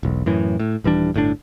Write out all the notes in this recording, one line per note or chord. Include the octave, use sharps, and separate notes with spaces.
E1 B1
F#2 A2 E3
A2
D#1 E3 G3 D4
G1 A2 C#3 D4